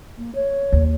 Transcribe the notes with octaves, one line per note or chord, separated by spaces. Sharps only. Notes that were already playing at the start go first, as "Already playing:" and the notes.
A#3
C#5
D#2